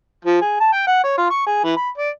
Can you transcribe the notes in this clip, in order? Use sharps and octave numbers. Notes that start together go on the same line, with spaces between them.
F3
G#4
A5
G5
F#5
C#5
F4
C#6
G#4
E3
B5
D5